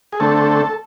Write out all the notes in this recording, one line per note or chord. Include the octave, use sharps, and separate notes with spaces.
G#4
D3 A3 C4 A4